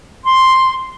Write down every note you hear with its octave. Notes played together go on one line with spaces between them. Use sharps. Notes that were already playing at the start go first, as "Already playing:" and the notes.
C6